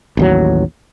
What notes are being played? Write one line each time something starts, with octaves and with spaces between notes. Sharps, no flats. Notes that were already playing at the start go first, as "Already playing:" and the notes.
A1 D#2 F#3